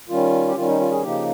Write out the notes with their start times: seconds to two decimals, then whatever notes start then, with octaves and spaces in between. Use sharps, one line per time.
0.09 D#3 G3 C#4 F4
0.48 G4
0.56 D#3 G3 C#4 F4
0.68 D#4
0.80 F4
0.91 G#4
1.03 C#3 F3 A#3 D#4 G4